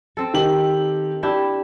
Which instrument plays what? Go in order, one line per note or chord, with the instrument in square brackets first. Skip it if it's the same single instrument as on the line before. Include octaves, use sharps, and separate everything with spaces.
[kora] C4 A4
[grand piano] D#3 G4 F#7
[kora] D4 E4 G4